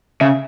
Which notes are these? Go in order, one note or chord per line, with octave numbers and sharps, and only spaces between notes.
C#3 E5